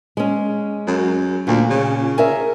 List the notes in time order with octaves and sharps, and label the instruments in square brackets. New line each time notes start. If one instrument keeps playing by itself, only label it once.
[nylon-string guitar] G#3 C#4
[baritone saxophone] F#2
[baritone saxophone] D2 [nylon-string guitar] A#2
[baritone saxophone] C#3
[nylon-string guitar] G#4 A#4 E5